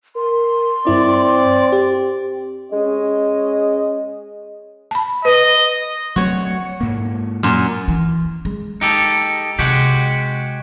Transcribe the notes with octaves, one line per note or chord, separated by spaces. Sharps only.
A#4 C6
G2 C4 E4 D5
G4
G#3 C#4 D#5
A5 B5
B4 D#5
F#3 A3 C4 F#4 C#5
G#2 A#3
F#2 A#2
E3
G#3
D#4 G4 A4
C3 G#3 F#4 G4